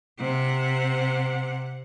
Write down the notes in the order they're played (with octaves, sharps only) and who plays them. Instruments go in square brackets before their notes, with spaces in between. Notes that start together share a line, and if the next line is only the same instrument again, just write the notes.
[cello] C3 F#5